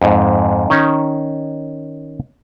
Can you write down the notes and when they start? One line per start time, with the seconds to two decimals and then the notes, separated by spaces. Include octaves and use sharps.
0.01 F2 G#2
0.70 D#3 C#4 D#4